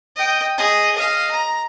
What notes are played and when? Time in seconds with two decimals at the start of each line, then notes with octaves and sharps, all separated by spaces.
0.16 D#5 G5
0.58 G#4 D#5
0.96 D#5 F5
1.32 A#5